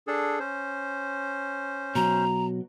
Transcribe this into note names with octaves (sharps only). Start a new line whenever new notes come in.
D4 G#4 A4
C#4 C5
B2 F#3 A#5